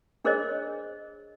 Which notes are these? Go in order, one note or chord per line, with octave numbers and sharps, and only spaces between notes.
D4 G#4 A#4 C5 C#5 D#5